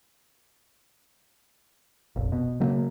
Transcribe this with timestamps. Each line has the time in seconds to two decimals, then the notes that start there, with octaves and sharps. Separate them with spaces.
2.16 F1 A#1
2.32 B2
2.60 C#3 F#3 A#3